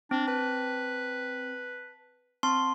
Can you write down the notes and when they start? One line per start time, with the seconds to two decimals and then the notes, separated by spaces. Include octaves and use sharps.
0.11 C4 D4
0.28 B4 A5
2.43 C4 A5 C6